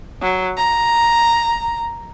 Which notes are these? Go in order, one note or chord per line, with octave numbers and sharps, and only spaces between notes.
F#3
A#5